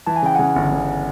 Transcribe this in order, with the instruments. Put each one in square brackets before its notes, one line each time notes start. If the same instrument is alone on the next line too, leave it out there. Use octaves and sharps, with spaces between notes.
[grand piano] E3 [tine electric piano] A5
[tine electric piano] G#5
[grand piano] C#3 [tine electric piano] G5
[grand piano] C#3 [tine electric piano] F#5 G#5
[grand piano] G1
G1